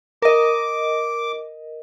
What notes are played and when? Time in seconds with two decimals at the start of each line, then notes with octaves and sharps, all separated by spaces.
0.22 A#4 D#5 D6